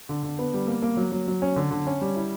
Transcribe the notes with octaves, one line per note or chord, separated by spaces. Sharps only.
D3
D3
B3
G3
A#3
A#3
F#3
F#3
F#3
C#4
D3
D3
C#4
G3
E4